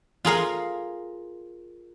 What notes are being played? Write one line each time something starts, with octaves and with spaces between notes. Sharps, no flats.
F4 G#4 A#4 F5